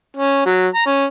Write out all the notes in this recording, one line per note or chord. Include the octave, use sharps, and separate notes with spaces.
C#4
F#3
A#5
C#4